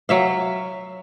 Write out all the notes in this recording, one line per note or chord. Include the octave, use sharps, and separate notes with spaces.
F#3 E5 F5